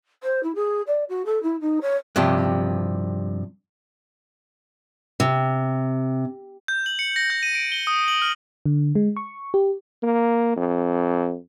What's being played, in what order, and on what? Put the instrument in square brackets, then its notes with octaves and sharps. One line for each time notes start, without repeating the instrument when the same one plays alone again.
[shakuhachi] C5
E4
G#4
D5
F#4
A4
E4
D#4
C#5
[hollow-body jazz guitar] G2 C3 F3 G4
[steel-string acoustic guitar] C3
[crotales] G6
F#7
C#7
A#6
G6
D#7
D7
G7
D#6
F#7
F6
[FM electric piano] D3
G#3
C#6
G4
[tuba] A#3
F2